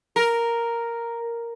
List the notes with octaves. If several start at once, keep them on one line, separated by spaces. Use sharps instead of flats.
A#4